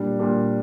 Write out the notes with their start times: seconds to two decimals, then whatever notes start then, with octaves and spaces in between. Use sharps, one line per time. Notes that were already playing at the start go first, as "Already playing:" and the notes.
Already playing: A#2 G3 D4
0.19 A#2 G3 D4